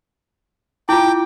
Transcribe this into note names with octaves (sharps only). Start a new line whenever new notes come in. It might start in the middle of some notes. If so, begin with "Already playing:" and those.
E4 F4 G5 D6